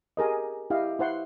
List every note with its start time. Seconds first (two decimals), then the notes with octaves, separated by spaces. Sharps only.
0.17 G4 G#4 A#4 D#5
0.70 E4 G4 D#5 F5
0.99 E4 C5 F#5 C6